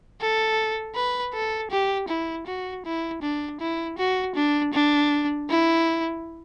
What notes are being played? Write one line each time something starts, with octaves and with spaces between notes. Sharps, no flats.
A4
B4
A4
G4
E4
F#4
E4
D4
E4
F#4
D4
D4
E4